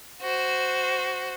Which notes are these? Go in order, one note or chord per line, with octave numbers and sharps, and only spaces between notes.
F#4 C5